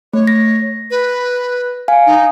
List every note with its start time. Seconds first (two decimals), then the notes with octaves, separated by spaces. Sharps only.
0.13 A3 C#5
0.27 A#6
0.91 B4
1.88 F5 G#5
2.06 D#4